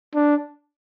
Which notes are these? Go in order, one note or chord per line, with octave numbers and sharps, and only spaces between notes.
D4